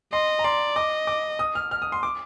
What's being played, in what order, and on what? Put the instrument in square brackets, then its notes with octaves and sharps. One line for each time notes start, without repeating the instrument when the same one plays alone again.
[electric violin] D#5 [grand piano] C6
[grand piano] A#5
[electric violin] D5 [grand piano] C6
[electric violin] D#5 [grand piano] D6
[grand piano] D6
D#6
F6
F6
D#6
C6
D6